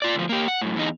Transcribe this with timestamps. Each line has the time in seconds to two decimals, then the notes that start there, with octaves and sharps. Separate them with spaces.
0.02 F4 D5
0.15 D2 F3
0.29 A#3 G4
0.48 F#5
0.61 F#2 A2
0.76 E2 D#4